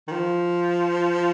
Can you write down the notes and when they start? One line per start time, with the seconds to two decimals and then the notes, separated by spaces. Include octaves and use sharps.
0.08 D#3
0.12 F3